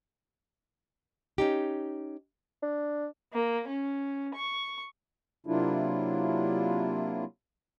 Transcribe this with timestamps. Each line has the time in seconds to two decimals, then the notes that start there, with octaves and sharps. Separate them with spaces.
1.38 C#4 D#4 G4
2.63 D4
3.33 A#3
3.67 C#4
4.35 C#6
5.47 C3 F#3 A#3 D4 E4 F4